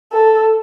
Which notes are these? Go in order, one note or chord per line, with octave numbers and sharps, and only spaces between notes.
A4